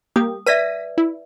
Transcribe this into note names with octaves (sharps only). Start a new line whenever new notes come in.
A#3 G4 D#6
B4 D5 E5 A#6 B6 D#7
E4